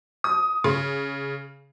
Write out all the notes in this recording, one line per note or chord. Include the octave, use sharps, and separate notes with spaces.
D#6
C#3